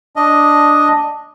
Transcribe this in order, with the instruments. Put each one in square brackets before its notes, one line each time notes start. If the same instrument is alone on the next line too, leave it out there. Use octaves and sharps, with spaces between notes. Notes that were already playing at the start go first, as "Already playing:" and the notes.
[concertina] D4 D#5